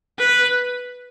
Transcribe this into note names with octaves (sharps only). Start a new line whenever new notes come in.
B4